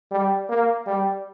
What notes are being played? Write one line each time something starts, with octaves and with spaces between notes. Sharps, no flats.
G3
A#3
G3